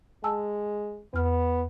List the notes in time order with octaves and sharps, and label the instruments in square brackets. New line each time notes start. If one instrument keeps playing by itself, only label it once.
[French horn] G#3 [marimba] G#5 A5 E6
[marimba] E2 F6 [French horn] B3